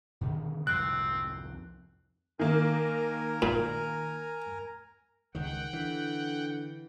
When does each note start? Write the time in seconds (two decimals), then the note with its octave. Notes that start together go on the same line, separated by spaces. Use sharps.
0.21 B2 D3 D#3
0.67 C2 F2 G#2 C4 F#6
2.39 D#3 A#3 A#4 G#5 A#5
3.42 A#2
5.35 C#2 D#3 F#5 G5
5.73 D3 E3